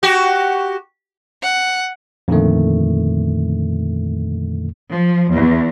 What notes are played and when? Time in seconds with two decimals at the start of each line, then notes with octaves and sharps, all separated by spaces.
0.03 F#4 G4
1.43 F#5
2.28 F2 A#2 D3 D#3 A3
4.89 F3
5.33 E2